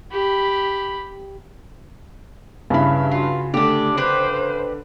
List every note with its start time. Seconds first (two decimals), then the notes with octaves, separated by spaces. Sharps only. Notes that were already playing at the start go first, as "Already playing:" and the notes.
0.12 G4 B5
2.70 G2 C#3 E4 B5
3.11 F4 F#4
3.54 D3 A3 D4 G4
3.97 D4 G4 B4 C5